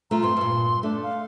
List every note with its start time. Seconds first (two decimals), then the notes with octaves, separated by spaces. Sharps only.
0.11 A3 F4 A#5
0.22 G2 C4 C6
0.37 G2 A#2
0.83 A3 D4
1.03 F5